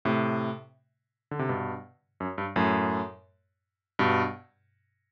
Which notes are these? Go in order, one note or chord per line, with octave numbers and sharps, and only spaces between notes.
A2 C3
D3
C3
G2 B2
F#2
G2
F#2 A2
G2 B2